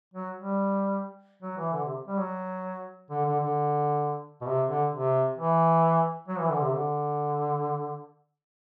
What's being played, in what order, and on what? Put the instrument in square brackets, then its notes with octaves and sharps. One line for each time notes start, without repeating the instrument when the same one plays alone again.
[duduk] F#3
G3
F#3
E3
D3
C3
G3
F#3
D3
D3
D3
B2
C3
D3
C3
E3
F#3
E3
D3
C3
D3